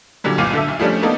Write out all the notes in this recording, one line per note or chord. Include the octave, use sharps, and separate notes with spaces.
A#2 D3 F#3 G3
G1 C#2 A#2 F5 D6 D#7
D3 A4 E5
B1
F3 G3 A3 C#4 D4
A#3 B3 D#4 A4